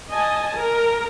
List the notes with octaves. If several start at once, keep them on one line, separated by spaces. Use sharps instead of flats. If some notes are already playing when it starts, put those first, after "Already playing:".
D#5 G#5 A5
A#4